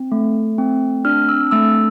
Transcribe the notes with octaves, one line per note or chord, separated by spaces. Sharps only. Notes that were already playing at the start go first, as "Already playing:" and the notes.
Already playing: C4
A3
C4
D4 F6
E6
A3 E6